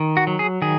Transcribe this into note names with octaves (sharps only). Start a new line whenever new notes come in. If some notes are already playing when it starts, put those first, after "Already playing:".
Already playing: D#3
F#4
F#3
G#4
D#3 G#4